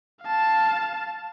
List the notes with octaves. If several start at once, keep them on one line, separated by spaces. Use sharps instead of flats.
F5 A5